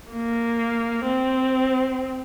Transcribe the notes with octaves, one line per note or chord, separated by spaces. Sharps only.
A#3
C4